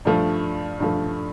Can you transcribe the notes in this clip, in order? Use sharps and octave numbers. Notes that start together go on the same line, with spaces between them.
G2 F3 A3
G2 F3 A3